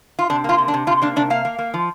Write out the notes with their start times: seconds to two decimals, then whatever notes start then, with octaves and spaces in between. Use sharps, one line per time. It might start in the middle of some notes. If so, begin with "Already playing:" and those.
0.19 F4
0.30 C3 D4
0.44 A#3 F4
0.58 C3
0.68 D4
0.74 C3
0.87 C3 F4
1.02 A#3 D4
1.16 C3 D4
1.30 A#3 F5
1.45 A#3
1.59 A#3
1.74 F3